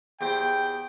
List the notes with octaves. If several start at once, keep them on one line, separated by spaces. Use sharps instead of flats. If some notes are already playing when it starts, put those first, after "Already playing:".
E2 G4 C5 G5